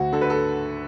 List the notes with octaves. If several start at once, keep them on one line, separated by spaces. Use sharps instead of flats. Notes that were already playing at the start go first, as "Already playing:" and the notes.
Already playing: D2 F#4
D3 A4
B4
A4